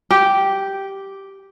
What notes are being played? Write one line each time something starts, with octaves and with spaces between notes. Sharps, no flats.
G4